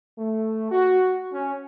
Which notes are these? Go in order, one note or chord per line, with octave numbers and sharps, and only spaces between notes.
A3
F#4
C#4